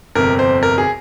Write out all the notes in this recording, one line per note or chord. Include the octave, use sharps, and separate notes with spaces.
G1 F2 C3 A#4
C5
A#4
G#4